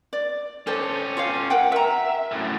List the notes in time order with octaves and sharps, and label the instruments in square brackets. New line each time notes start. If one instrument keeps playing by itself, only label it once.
[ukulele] D5
[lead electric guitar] C#4 G4 [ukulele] A4 C5
[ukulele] F4 C#5 F5
A#4 F#5 G5
[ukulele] A#4 A#5 [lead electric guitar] E5
[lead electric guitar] F#2 A2